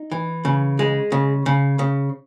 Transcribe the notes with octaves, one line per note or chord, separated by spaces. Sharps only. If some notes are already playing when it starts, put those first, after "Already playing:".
Already playing: D#4
E3
C#3
G#3
C#3
C#3
C#3